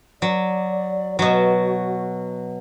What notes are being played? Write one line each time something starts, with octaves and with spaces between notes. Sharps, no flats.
F#3 D5
B2 F#3 F#4